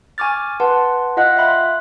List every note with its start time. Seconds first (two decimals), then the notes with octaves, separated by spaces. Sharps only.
0.18 G#5 C#6 D6 F6 A6
0.60 B4 F#5 A5 C6
1.17 F4 D#5 F5 F#5 F#6
1.37 E5 F5 G5 B5 C6 F#6